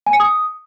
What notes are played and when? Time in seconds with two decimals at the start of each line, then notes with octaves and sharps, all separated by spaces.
0.07 G#5
0.13 C#7
0.20 D#6